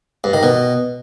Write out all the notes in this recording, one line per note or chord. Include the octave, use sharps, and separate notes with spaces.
G2
D#3
B2